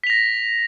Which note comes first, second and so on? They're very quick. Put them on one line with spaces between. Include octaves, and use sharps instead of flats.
B6 F7 A#6